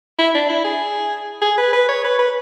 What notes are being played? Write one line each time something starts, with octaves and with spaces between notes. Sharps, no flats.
E4
D4
E4
G#4
G#4
B4
B4
C#5
B4
B4